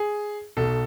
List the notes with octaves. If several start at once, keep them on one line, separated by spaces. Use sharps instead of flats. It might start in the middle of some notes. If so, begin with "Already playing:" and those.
Already playing: G#4
B1 B2 A4